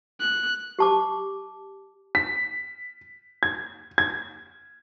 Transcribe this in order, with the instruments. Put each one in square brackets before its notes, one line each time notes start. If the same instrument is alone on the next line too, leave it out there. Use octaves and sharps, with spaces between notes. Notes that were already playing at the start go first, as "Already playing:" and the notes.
[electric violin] F#6
[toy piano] G4 A5 D6
[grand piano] B6
G#6
G#6